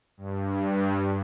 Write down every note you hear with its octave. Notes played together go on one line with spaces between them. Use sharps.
G2